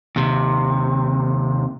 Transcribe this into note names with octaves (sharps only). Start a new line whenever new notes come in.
D#2 C3